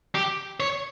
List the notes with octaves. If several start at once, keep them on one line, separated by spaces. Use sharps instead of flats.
G4
C#5